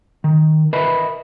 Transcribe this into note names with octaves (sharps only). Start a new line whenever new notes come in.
D#3
A#4 B4 D#5 E5 B5